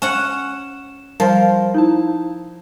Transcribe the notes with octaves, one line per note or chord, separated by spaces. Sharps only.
C#4 F#5 E7
F3 G3 A#4
D#4 E4 A5